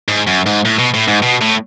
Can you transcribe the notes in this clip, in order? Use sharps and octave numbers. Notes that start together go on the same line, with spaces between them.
G#2
F#2
G#2
A2
B2
A2
G#2
B2
A2